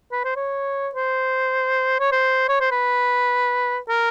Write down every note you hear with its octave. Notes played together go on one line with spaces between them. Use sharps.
B4
C5
C#5
C5
C#5
C5
C#5
C5
B4
A#4